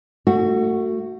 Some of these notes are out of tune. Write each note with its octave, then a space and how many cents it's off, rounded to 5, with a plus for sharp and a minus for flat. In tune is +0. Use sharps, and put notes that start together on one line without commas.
A3 +30 F#4 +0